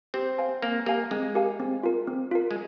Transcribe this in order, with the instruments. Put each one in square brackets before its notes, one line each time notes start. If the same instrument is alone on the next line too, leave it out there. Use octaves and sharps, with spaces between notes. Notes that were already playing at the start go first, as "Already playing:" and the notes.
[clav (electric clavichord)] C4 [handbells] G4
[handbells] C5 F5 G#5
[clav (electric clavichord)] A#3 [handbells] C4
[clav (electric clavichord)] A#3 [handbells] G4 A#4 F5 G#5
[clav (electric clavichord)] G#3 [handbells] C4
[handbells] G4 A#4 F5 G#5
C4
F4 A#4
C4
F4 A#4
[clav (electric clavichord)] G#3